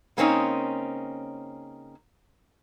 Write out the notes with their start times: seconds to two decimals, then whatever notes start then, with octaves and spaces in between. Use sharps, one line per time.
0.17 C#3 A#3 C4 C#4 D#4